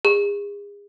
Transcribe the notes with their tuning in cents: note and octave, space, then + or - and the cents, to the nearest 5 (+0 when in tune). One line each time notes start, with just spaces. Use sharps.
G#4 -35